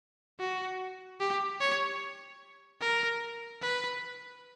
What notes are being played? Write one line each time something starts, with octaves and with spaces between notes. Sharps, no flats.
F#4
G4
C#5
A#4
B4